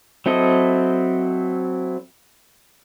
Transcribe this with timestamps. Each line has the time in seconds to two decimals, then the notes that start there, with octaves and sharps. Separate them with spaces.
0.26 F#3 C4 E4 A4 D#5